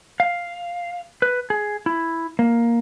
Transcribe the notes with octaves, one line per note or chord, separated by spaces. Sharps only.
F5
B4
G#4
E4
A#3